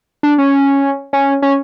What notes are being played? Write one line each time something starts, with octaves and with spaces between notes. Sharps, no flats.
D4
C#4
C#4
C#4